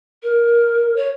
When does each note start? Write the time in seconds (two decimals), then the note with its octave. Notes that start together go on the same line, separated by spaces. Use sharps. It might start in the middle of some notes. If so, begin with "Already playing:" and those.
0.23 A#4
0.96 C#5